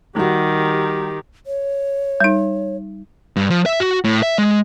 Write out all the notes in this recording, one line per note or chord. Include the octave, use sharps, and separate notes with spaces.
D#3 G3 F#4 G4
C#5
G3 D#4
G2
F3
E5
F#4
A2
E5
G#3